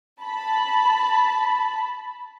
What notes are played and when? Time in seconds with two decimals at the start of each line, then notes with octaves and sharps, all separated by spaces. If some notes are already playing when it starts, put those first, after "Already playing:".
0.22 A5 B5